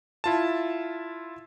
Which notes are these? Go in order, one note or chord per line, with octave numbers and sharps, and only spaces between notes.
E4 F4 A5